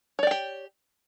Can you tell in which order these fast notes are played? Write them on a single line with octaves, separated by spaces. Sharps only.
C#5 D5 G5 G4